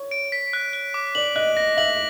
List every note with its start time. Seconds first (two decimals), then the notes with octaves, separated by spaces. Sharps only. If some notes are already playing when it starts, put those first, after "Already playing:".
Already playing: C#5
0.11 D7
0.32 B6
0.53 F#6
0.73 F#6
0.94 D6
1.15 D5 F#7
1.36 D#5 F#6
1.57 D#5 A#6
1.77 E5 F#7